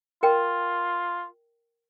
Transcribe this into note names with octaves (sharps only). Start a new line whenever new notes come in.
F4 A#4 G5